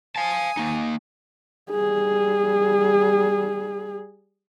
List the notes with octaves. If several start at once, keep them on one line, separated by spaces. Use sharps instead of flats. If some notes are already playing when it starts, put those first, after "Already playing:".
F5 G#5 A5 D#6
A#3 D#4
G3 G#4